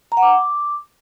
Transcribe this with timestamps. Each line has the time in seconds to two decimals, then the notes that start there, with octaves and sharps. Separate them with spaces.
0.12 A#5
0.17 F#5
0.22 D6